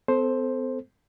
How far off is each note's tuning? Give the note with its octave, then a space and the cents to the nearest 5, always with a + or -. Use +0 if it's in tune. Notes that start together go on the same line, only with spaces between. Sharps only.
C4 -45 A4 +0 C5 +5